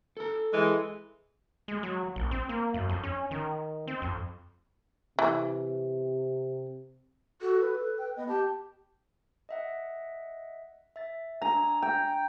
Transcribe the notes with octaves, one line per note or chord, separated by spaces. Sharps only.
A4 A#5
E3 G#3
G#3
F#3
A#1
C4
A#3
F#2
F2
C#4
D#3
C4
F2
C3 E3
F#4 A4
B4
A4
G5
B3 D#5
G4 A5
D#5 E5 F#5
E5 A6
D4 G#5 A#5
G5